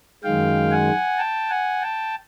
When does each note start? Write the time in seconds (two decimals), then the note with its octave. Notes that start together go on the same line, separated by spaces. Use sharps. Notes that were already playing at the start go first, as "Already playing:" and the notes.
0.23 F#2 D#3 G#3 F5 G5
0.71 F#5 G#5
1.18 G5 A5
1.50 F#5 G#5
1.82 G5 A5